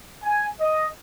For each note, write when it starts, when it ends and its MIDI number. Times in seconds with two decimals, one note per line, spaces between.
0.23 0.48 80
0.60 0.87 75